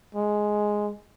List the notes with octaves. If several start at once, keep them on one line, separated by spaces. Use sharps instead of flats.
G#3